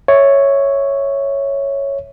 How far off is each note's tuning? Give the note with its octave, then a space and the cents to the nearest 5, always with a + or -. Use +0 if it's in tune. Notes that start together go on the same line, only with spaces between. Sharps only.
C#5 +0 E5 -5